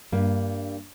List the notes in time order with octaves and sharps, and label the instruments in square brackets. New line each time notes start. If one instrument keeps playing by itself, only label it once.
[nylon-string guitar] G2 A#3